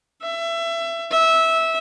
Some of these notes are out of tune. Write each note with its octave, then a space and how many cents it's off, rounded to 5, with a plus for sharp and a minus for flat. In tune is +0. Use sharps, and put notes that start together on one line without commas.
E5 +25
E5 -15